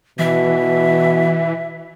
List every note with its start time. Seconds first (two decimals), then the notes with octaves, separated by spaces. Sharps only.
0.19 B2 E3 E5